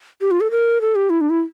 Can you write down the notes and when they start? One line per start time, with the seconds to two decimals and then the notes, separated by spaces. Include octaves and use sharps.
0.21 G4
0.31 F4
0.41 A4
0.51 A#4
0.81 A4
0.95 G4
1.10 E4
1.21 D4
1.30 E4